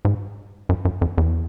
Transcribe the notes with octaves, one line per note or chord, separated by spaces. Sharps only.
G#2
F#2
F#2
F2
E2